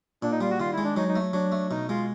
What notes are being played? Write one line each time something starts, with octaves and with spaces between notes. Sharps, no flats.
A#2 D4
D#4
G3 F4
F#4
D#3 F4
E4
G#3
D4
F#3 D#4
D#4
A3
F#3 D4
A3
B2 D#4
G#3 F4